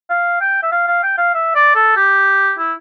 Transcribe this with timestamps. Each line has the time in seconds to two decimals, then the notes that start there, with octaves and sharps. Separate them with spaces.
0.10 F5
0.41 G5
0.63 E5
0.72 F5
0.88 F5
1.03 G5
1.18 F5
1.34 E5
1.55 D5
1.75 A4
1.96 G4
2.59 E4